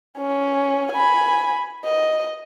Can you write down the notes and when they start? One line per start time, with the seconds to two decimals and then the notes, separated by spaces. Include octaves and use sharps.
0.19 C#4
0.93 G#5 B5
1.85 D#5